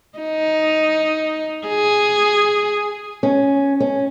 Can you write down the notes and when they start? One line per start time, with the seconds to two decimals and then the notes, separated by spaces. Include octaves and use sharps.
0.18 D#4
1.67 G#4
3.23 C#4
3.80 C#4